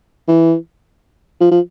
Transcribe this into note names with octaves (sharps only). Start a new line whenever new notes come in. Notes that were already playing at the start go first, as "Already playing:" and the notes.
E3
F3
F3